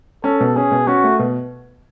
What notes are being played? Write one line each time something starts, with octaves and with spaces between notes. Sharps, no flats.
C#4 A4
B2
C#4 G#4
B2
C#4 F#4
A3
B2